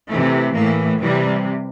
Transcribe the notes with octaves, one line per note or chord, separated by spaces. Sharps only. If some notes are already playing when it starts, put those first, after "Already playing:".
C3 E3 A3
A2 E3 A#3
C3 E3 G3